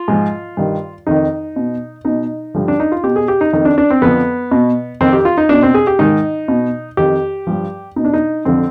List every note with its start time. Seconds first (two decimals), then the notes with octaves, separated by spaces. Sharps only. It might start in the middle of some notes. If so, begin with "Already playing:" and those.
Already playing: F4
0.08 G#2 F3
0.57 G2 D#3
1.07 F2 D#3 D#4
1.56 B2
2.05 B2 D#4
2.55 G2 D3 F3
2.68 D4
2.80 D#4
2.92 F4
3.03 B2 G4
3.16 G#4
3.28 G4
3.41 D#4
3.53 F2 D#3 D#4
3.65 D4
3.78 D4
3.90 C4
4.02 F2 D3 F3 B3
4.51 B2
5.01 F2 D#3 C4
5.13 G4
5.25 F4
5.38 D#4
5.49 B2 D4
5.63 C4
5.74 G#4
5.87 G4
5.99 G#2 D#3 D#4
6.48 B2
6.97 F2 D#3 G4
7.47 G2 F3
7.96 B2 D#4
8.05 D4
8.13 D#4
8.45 F2 D3 F3 C4